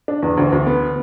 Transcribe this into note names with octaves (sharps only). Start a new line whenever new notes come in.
D4
E2
D2
D2
B3